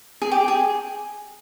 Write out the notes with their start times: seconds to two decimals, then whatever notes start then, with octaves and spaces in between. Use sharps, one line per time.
0.22 G#4
0.31 G4
0.48 G#4